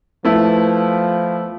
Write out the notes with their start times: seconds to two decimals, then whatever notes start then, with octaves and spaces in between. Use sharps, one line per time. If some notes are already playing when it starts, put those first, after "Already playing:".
0.25 F3 A3 B3 E4